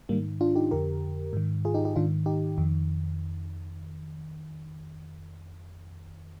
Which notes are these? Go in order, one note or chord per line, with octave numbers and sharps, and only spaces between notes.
G#2 D#3 G3 A#3
D4 F4
D#4 G4
F2 D3 G4 A#4
G#2 D#3
F4 G#4
D#4 G4
D#4 G4
G#2 D#3 D4 F4
D#4 G4
F2 D#3